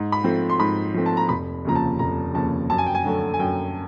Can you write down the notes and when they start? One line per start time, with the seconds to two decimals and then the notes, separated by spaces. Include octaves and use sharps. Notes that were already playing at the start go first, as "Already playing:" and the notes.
Already playing: G#2
0.12 B5
0.24 F3 A3 C4
0.50 C6
0.60 G#2 B5
0.94 F3 A3 C4
1.06 A5
1.17 A#5
1.29 F1 B5
1.65 D#2 C#3 F3 A#5
1.75 A5
1.99 F1 A#5
2.34 D#2 C#3 F3 A5
2.70 F#2 A5
2.78 G#5
2.86 G5
2.95 G#5
3.05 D3 F#3 A3
3.34 G#5
3.39 F#2 G5